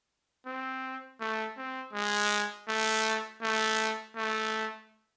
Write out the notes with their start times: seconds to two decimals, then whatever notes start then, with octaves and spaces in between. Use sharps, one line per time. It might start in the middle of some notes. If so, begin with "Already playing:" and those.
0.46 C4
1.21 A3
1.57 C4
1.94 G#3
2.69 A3
3.42 A3
4.16 A3